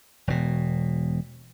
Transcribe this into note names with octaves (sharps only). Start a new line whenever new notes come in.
E1 B2